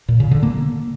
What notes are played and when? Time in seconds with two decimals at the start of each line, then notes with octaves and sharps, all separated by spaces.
0.08 A#2
0.20 C#3
0.31 D3
0.43 A#3